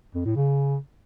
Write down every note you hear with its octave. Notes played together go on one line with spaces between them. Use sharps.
F2
A2
C#3